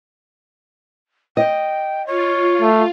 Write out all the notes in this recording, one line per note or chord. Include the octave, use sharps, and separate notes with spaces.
D#5 G5
F4 C#5
A3